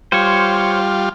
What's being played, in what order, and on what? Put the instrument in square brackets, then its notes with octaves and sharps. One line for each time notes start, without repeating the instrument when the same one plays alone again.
[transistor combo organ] G3 F4 [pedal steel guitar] C5 C#5